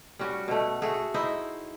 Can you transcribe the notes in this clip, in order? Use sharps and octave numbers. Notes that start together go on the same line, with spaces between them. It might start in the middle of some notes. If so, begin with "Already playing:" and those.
G3 C#4 F#4
B2 A3
A3 F#4 G#4
D#4 E4 C5 D#5